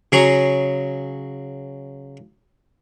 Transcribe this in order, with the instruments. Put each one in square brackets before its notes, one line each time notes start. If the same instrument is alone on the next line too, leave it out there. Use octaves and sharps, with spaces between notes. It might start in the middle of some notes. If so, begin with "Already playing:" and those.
[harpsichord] C#3 F#3 G#4 A#5 C#6